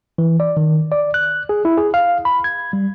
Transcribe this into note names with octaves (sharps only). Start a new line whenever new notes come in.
E3
D5
D#3
D5
F#6
G#4
E4
G#4
F5
B5
G#6
G3